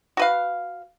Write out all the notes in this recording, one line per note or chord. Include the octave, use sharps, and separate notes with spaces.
F#4 B4 F5